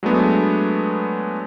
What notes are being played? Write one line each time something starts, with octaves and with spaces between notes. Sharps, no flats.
F#3 G#3 A3 B3 D4